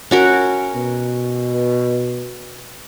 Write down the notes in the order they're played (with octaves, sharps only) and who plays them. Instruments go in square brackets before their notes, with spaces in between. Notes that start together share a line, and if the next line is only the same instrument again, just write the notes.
[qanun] C#4 F#4 A#4
[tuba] B2